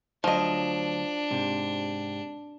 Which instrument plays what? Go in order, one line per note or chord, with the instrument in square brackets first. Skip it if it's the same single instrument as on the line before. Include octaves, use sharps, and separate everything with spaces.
[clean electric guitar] D2 F#3 [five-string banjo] F3 D#5 [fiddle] D4
[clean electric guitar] G#2 C3